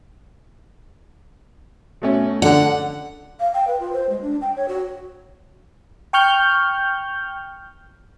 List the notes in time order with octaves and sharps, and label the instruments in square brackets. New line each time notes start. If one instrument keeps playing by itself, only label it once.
[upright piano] B2 A3 C#4
[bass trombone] D3 [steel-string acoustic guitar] F#5
[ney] F5
G5
B4
F4
C5
G#3
D4
G5
C#5
F#4
[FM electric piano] G5 C#6 F6 G6